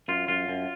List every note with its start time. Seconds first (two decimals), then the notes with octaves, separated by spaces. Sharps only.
0.08 F#2 F4
0.28 F#2 F4
0.48 F#2